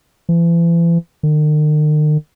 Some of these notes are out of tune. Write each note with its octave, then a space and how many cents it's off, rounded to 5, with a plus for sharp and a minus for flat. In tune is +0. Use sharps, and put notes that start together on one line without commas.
E3 +40
D#3 -45